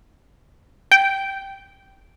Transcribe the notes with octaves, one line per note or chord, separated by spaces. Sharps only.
G5